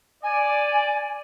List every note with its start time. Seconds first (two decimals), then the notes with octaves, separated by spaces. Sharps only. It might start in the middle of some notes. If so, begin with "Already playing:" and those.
0.23 D5 G#5